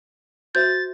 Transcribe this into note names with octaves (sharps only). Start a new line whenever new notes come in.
F#4 C5 E5 G6 A6